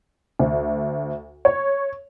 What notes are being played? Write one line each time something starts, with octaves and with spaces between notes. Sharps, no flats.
D2
C#5